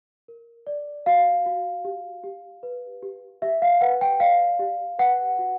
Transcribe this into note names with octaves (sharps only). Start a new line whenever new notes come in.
A#4
D5
F#4 F5
F#4
G4
G4
B4
G4
G4 E5
F5
B4 F#5
G5
D5 F5
G4
B4 F#5
F#4